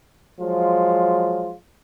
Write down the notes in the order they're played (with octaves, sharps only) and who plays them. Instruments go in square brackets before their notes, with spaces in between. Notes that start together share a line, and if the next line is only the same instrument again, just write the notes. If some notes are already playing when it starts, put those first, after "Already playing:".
[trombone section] F3 F#3 G#3 F4